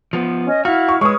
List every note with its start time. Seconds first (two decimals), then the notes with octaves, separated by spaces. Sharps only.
0.13 F3 B3
0.46 C#4 D#5
0.65 E4 F#4 F5 F6
0.88 C#6
1.01 G#3 B4 C#5 C#6 D#6